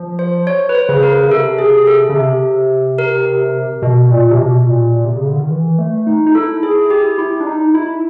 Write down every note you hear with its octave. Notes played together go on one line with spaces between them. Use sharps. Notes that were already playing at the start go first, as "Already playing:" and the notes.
Already playing: F3
C5
C#5
B4
C5
C#3
A#4
C#3
C3 A4
G#4
A4
C#3
C3
A#4
B2
B2
A#2
C3
B2
A#2
C3
C#3
D3
D#3
E3
A3
D#4
D#4
E4 A4
G#4
G4
E4
D4
D#4
E4